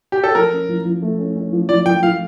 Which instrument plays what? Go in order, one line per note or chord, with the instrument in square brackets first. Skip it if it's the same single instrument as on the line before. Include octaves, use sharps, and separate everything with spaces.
[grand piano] G4
A4
[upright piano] F3 [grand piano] A#4
[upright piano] C#4
F3
F3
A3
C#4
C#4
F3
[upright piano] F3 [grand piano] D5
[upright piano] F3 [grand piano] G5
[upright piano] F3 [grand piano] F5